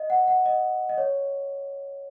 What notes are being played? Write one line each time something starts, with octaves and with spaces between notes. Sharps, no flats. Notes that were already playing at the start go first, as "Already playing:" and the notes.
Already playing: D#5
F#5
F#5
D#5
D#5
C#5